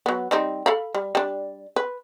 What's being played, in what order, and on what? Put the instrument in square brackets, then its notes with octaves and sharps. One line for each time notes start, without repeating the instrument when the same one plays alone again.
[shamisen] F#3 B3
G3 C4 D#4
A4 F5 B5
G3
G3 D4
B4